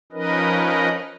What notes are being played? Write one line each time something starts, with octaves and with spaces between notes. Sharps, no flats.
F3 C#4 D#4 A#4 B4 D#5